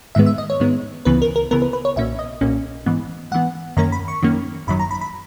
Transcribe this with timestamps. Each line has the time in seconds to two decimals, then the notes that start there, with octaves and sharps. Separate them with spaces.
0.15 G#2 D#3 G#3 B3 E5
0.26 E5
0.38 D#5
0.50 C#5
0.60 G#2 D#3 G#3 B3
1.05 C#2 C#3 E3 B3 B4
1.22 A#4
1.36 A#4
1.51 C#2 C#3 E3 B3 A#4
1.62 B4
1.73 B4
1.85 C#5
1.96 B1 A#2 A#3 C#4 E5
2.19 D#5
2.41 B1 A#2 A#3 C#4
2.86 G#2 E3 B3
3.31 G#2 E3 B3 F#5
3.77 F#2 D#3 A#3 C#4 A#5
3.92 B5
4.08 C#6
4.22 F#2 D#3 A#3 C#4
4.67 G#1 F#2 D#3 F#3 B5
4.79 A#5
4.91 B5
5.01 B5